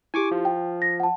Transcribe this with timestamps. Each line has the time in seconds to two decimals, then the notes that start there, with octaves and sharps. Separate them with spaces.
0.14 E4 G4 G#5 C#6 D6
0.31 F3
0.45 G5
0.82 A#6
1.00 F#5 A5